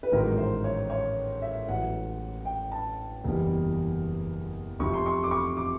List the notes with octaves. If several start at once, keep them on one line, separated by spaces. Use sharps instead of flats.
B4
A1 G#2 D#3 F#3 A#4
C5
C#5
C#5
E5
A1 A2 F#3 F#5
G5
A5
F#1 E2 B2 G3
F1 F2 C3 F3 C#6
C6
C#6
D6
C#6
D6